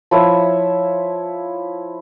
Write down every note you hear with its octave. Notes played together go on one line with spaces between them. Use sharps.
F3 E4 C#5 E5